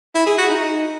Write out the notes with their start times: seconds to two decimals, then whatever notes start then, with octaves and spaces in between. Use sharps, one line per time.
0.15 E4
0.26 G#4
0.38 F#4
0.49 D#4